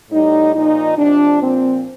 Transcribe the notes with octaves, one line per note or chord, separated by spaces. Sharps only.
A2 G3 D#4
A#2 F3 D#4
C3 F3 D4
A#2 F3 C4